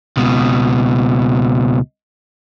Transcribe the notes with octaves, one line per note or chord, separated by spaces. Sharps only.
C#2 B2